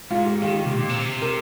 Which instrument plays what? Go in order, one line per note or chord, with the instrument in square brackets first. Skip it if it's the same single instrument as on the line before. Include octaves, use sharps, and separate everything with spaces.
[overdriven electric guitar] G#2 [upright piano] F4
[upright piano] G4
[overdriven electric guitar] D#3 [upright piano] G4
[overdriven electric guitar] C3
A#2
C3
[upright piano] A#4